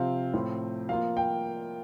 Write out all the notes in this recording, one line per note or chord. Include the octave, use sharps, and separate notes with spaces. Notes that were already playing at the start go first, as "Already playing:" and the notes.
Already playing: C3 F3 C4 F5
A2 F3 C4 F4
F3 A#3 F4 F5
G5